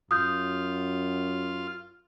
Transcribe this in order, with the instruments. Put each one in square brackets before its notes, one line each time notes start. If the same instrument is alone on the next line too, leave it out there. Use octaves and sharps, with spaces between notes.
[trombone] F#2 [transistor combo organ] F4 [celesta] D#6 G6